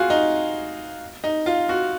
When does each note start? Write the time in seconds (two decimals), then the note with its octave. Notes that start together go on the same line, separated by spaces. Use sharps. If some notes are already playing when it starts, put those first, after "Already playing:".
Already playing: F4 F#4 G#4
0.10 D#4
1.24 D#4
1.46 F4
1.69 F#4